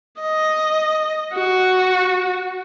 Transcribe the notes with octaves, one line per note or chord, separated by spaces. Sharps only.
D#5
F#4